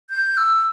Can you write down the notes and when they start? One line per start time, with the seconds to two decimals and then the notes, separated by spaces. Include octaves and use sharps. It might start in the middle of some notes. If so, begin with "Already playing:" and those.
0.10 G6
0.37 E6